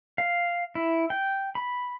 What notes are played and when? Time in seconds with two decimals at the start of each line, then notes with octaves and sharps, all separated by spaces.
0.18 F5
0.75 E4
1.10 G5
1.55 B5